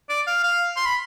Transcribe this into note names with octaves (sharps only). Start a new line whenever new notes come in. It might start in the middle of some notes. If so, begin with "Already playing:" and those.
D5
F5
F5
C6
B5